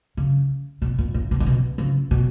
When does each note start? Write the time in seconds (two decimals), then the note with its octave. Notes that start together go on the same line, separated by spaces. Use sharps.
0.17 C#3
0.82 B2
0.99 A#2
1.14 A#2
1.31 B2
1.40 C#3
1.47 B2
1.78 C#3
2.11 B2